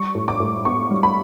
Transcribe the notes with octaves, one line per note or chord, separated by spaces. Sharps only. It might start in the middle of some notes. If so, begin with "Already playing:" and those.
Already playing: G3 C#6
A2
D6
A2
B3 C#6
G3
B5